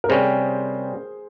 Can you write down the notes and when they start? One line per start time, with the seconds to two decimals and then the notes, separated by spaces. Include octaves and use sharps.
0.04 A#4
0.09 C3 G3 C#4 G#4 C5